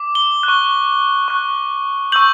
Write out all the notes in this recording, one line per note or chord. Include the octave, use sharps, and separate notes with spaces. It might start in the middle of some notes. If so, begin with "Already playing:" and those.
Already playing: D6
G7
F#6
C#6
C#6 F#6
C#6 E6 G6 F#7